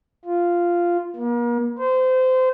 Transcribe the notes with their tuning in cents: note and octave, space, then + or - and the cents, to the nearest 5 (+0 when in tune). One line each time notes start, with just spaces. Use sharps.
F4 -5
A#3 +40
C5 -25